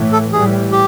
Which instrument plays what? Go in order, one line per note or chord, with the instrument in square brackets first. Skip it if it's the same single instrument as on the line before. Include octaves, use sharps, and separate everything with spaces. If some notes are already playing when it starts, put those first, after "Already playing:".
Already playing: [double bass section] A2 E3 A3
[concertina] A4
[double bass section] A2 E3 G3 [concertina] G#4
[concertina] G4